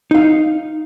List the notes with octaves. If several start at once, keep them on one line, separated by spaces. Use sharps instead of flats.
D#4 F5